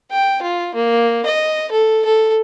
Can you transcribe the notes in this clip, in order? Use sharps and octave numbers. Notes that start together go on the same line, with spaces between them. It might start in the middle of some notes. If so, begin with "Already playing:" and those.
G5
F4
A#3
D#5
A4
A4